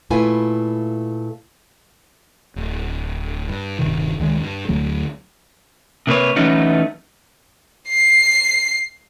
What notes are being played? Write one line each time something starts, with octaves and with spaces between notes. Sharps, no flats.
A#2 A3 E4 F4 B4 G#5
D1
G2
D#1 G2 C3 D#3
C#2 D#3 G#3
G2
D2 D3 F#3 A3
C3 A#3 B4 C#5
E3 F#3 A3 B3 C#4 D#4
C7